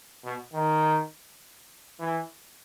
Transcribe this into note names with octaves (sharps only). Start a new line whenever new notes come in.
B2
D#3
E3